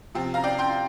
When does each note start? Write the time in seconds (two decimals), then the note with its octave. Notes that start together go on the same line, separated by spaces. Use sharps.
0.14 C3 F3 C4
0.34 F5 A#5
0.44 D5 G5
0.59 G5 C6